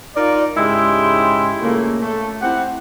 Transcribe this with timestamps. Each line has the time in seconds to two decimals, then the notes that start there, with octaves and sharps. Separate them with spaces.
0.15 D#4 F4 A#4 D5
0.57 G#2 C#3 G#3 E4 G4 C6
1.61 A#2 C#3 A3 A#3
2.01 A3
2.42 C4 E4 G4 F#5